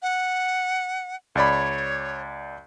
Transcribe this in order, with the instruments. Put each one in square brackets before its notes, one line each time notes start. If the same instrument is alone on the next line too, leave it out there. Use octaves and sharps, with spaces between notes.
[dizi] F#5
[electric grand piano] C#2 D5 B5 [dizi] C#5